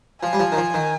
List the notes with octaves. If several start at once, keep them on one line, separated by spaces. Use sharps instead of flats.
F3 G#5
G3
F3
D#3
F3
D#3